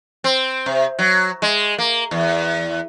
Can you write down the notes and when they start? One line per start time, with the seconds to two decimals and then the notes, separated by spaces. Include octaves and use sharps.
0.24 C4
0.66 C3
0.99 F#3
1.42 G#3
1.78 A#3
2.11 E2